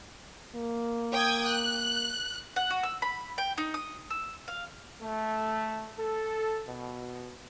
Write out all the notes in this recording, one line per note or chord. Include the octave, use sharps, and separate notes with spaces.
A#3
G5 D#6 G#6
F#6
F#5
F#4
E6
B5
G5
D#4
D#6
E6
F5
A3
A4
B2